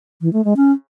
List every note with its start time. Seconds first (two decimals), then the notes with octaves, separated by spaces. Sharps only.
0.21 E3
0.33 A3
0.45 G#3
0.56 C#4